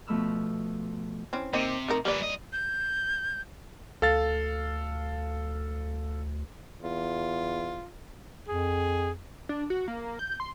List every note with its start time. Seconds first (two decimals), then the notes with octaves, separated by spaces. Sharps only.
0.07 B2 F3 A3 B5 E6 F6
1.33 E3 C4 C#4
1.53 C3 A#3 C4 D#4
1.88 A3 D#4 A#4
2.05 F3 G3 A#3 B4 D5
2.20 G2 D#5
2.53 G6
4.02 D2 A4 F5 A6
6.81 E2 F4
8.48 F2 G#4
9.49 D4
9.70 F#4
9.88 A#3
10.19 G6
10.40 C6